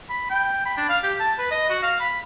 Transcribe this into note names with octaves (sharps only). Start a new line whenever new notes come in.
B5
G5
B5
D4
F5
G4
A5
B4
D#5
F#4
F5
B5